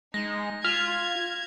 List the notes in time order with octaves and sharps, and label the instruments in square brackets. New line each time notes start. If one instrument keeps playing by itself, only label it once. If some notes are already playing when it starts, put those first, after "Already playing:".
[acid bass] G#3 [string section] D#4 [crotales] A#6
[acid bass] F4 [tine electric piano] F6 [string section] G#6 [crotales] B6 E7 F7